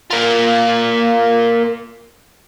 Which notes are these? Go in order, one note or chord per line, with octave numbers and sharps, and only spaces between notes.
A#3 F4